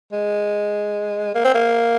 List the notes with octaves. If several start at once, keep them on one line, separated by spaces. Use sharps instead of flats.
G#3
A#3
C4
A#3